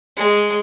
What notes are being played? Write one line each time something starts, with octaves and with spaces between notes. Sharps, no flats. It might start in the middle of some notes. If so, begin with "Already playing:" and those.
G#3